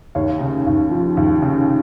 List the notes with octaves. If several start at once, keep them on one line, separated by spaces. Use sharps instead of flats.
D#2 C#5 F5
C#3
D#2
F3
D#2
C#3